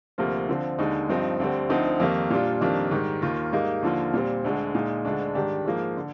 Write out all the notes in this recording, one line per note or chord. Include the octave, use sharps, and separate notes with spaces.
D2 C3 F3 A#3 F4
D3 F3 C4
D#2 D3 G#3 D#4
G2 F3 C4 D#4
D2 D3 G3 C4
D2 D3 F3 C4 D#4
F2 D#3 G3 A#3
A#2 G3 D4 F4
F2 D#3 G3 A#3 D4
G#2 D#3 G3
D#2 D#3 A#3 F4
G#2 G3 A#3 D#4
D#2 D3 F3 A#3 F4
A#2 G3 C4
D2 D3 G#3
A#2 G#3 D#4
D2 D3 G#3 D4
G#2 D#3 G3 D4 G4
G#2 F3 A#3
D3